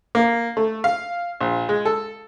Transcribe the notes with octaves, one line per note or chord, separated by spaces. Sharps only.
A#3
A3
F5
A#1
G#3
A4